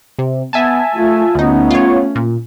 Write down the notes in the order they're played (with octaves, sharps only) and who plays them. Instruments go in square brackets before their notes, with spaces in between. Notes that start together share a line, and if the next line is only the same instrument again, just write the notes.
[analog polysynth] C3
[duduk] B3 [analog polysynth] E5 G#5 A5
[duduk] A3 [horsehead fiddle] F4
[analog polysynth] D2 D#4 [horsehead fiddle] A3 C#4 [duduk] B3
[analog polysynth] F4 C#5
A#2